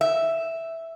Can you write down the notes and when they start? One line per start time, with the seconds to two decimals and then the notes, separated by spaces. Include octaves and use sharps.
0.01 E5